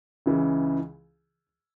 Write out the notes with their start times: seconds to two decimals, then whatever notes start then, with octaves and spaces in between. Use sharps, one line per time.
0.26 C#2 C#3 E3